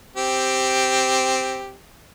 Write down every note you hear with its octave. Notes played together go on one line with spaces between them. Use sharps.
C4 G4